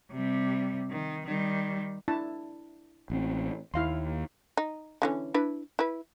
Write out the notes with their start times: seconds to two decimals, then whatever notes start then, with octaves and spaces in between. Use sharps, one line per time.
0.12 C3 G3
0.90 D#3
1.27 D#3 G3
2.08 D4 E4 A5
3.10 A1 C4
3.74 D#2 E4 F5 C6
4.57 D#4
5.02 D3 E3 C#4
5.34 D4 E4 B4
5.79 E4 B4